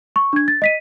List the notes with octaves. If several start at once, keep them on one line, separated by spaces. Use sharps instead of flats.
C#6
D4 G#6
A6
D#5 B6 D#7